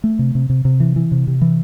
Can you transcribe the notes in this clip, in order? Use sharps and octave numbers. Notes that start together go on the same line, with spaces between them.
A3
C3
C3
C3
C3
E3
E3
C3
C3
E3